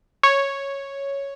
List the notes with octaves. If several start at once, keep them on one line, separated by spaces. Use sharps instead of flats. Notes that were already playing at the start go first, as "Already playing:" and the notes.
C#5